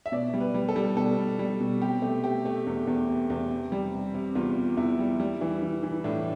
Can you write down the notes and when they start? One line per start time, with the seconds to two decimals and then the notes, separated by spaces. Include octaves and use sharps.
0.06 E5
0.12 B2 D5
0.34 G3
0.41 B4
0.54 G3
0.69 A4
0.76 G3
0.96 B2 A4
1.18 B2
1.39 G3
1.60 B2
1.82 C3 G4
2.02 A3
2.24 A3 G4
2.45 A3
2.67 E2
2.87 E2
3.09 C3
3.30 E2
3.51 C3
3.72 G3
3.93 C3
4.14 C3
4.35 E2 F4
4.57 C3
4.77 E2 E4
4.99 G3
5.20 G3
5.41 E3
5.62 E3
5.83 E3
6.04 A2 D4